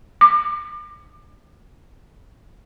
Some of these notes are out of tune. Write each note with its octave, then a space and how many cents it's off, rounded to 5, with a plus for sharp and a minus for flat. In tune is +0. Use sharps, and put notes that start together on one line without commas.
D6 +35